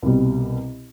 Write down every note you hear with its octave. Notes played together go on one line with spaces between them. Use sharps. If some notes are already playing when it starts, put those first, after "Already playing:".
C2 B2 G3